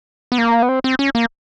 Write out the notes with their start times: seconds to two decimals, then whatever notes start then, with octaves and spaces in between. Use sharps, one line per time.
0.32 B3
0.38 A#3
0.62 B3
0.69 C4
0.84 C4
0.99 C#4
1.15 A#3